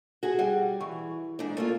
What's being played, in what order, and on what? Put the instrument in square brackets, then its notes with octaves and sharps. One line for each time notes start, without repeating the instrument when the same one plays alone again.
[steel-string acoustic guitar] F#4 G#4
[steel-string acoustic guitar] G3 [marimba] G#4 F#5
[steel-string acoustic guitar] E3 [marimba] C#6
[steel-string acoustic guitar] G#2 D4
A3 A#3 F4